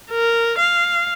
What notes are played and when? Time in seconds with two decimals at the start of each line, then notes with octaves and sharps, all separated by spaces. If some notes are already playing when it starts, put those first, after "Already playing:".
0.11 A#4
0.58 F5